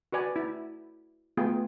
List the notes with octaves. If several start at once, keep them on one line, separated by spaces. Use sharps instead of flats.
F#4 B4 D5 G#5
E4
A3 B3 F4 G#4 G5